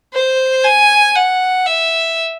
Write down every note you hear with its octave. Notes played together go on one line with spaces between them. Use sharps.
C5
G#5
F#5
E5